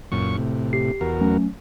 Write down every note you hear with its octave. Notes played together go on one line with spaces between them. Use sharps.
F#2 A#2 C#6
A2 C3
G4 C7
E2 F#4 A#4
F#3 A3 C#4